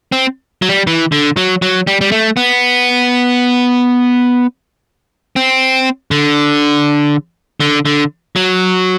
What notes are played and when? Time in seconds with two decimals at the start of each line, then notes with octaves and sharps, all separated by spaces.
0.12 C4
0.62 F#3
0.69 G3
0.87 E3
1.12 D3
1.37 F#3
1.62 F#3
1.87 G3
2.01 G3
2.12 A3
2.37 B3
5.36 C4
6.11 D3
7.60 D3
7.86 D3
8.36 F#3